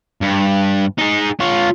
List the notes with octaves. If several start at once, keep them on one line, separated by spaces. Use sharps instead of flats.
G2
D#4 G#4
F4 C#5